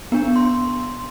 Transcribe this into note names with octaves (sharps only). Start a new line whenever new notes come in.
B3 D4
C6